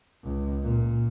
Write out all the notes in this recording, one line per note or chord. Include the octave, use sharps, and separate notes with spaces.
C#2
A#2